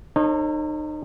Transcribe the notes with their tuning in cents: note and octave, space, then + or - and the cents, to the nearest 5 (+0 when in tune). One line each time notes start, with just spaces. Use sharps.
D#4 -30 A4 +35 C#5 -45